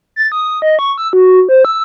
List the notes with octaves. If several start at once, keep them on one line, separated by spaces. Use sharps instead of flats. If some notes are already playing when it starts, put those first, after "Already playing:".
A6
D#6
D#5
C#6
E6
F#4
C5
E6